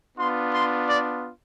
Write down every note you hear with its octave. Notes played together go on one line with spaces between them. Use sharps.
B3 D4 F4 C6
C6
D5